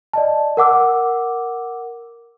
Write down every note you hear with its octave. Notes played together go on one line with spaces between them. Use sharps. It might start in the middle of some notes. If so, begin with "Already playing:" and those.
D5 D#5 A5
A#4 F#5 D6 E6